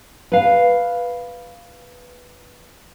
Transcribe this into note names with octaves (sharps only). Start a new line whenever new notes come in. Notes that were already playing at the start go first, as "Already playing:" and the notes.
B4 F5